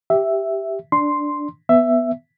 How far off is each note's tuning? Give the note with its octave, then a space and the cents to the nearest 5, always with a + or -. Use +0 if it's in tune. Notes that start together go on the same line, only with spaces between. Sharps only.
G4 +0 E5 +0
D4 +0 C6 +0
B3 +0 E5 +10